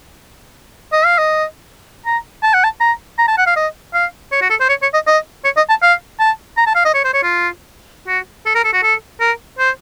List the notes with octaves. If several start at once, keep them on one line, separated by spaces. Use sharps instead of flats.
D#5
F5
D#5
A#5
A5
F#5
A5
A#5
A#5
A5
F#5
F5
D#5
F5
C#5
F#4
A4
C5
C#5
C#5
D#5
D#5
C#5
D#5
A5
F5
A5
A#5
A5
F5
D#5
C#5
C5
C#5
F4
F#4
A4
A#4
A4
F#4
A4
A#4
C5